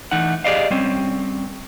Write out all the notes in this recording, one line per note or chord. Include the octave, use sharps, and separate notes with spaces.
E3 A3 D#4 F#5
G4 G#4 C5 D5 D#5 F5
G3 C4 C#4